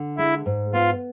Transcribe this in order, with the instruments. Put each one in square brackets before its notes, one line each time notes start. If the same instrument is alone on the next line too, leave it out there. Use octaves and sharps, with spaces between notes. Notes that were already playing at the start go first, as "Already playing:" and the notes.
Already playing: [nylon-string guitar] D3
[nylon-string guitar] G#3 [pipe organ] E4
[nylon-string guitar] G#2
[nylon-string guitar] B3 [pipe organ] F4